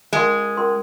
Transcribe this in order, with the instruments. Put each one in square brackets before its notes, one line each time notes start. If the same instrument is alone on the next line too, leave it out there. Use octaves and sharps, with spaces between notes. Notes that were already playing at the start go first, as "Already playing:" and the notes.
[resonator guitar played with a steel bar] G#3 [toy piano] C#4 F4 A#4 F5 C6
[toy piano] C#4 F4 A#4 F5 C6